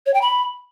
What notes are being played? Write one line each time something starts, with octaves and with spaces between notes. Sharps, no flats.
C#5
G5
B5